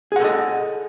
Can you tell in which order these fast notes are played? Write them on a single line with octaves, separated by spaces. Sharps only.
G#4 F#5 A4 D#5